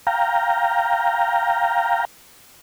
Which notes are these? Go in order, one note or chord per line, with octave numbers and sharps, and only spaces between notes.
F5 G5 A#5